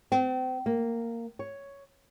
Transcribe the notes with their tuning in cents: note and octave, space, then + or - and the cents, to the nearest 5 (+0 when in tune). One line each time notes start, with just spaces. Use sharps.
C4 -35
A#3 -10
C#5 +5